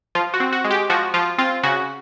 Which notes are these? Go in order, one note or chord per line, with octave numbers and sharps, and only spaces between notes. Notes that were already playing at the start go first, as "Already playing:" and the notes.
F3 F4
F#4
C4
F#4
G#3
G4
F3 F#4
F3 F4
C4 F4
C#3 F#4